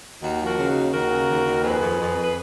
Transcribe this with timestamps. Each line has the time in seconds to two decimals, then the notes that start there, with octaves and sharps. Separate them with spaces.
0.23 D#2 D#4 F#4
0.41 F3
0.46 F#4 A#4
0.58 C#3
0.70 D#4 F#4
0.75 D#2
0.93 D#2 F#4 A#4
1.10 C#3
1.28 D#2
1.45 D#2
1.63 F2 G#4 B4
1.81 F2
1.98 F2
2.16 F2
2.23 B4